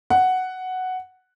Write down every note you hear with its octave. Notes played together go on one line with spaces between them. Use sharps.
F#5